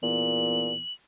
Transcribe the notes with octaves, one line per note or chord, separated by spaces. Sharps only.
E2 A#2 F#7